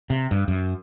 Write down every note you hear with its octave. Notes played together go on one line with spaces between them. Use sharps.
C3
G2
F#2